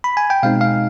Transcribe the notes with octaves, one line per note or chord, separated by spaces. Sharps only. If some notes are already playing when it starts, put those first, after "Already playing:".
B5
G#5
G5
B2 G#3 C4 D#4 F5
F5